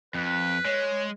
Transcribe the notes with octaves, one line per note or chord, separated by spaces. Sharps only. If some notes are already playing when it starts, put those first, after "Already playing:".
F2 B4
G#3 C#5